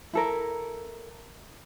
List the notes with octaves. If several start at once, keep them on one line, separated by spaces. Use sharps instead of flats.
E4 A4 A#4